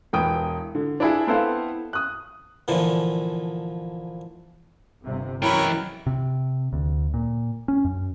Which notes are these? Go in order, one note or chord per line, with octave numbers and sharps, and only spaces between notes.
E1 E3 G5 D#6 D7
D3
D4 E4 G#4
B3 C4 E4 A4 C5 F5
D#6 F#6
A#2 D3 E3 F3
G1 C3
F#2 E3 E4 A#4 B4 C#5 G5
C3
D2
A#2
C#4
F#2